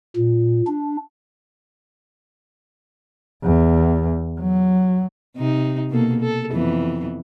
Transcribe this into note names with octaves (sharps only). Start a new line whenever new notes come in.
A#2
D4
E2
F#3
C3 D#4
B2 A#3 A4
A4
F2 E3 B3